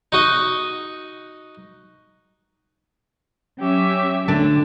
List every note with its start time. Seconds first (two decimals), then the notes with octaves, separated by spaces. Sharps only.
0.12 D#4 F#4 D#5
3.60 F#3 C#4 G4 E5
4.28 D2 D3 D4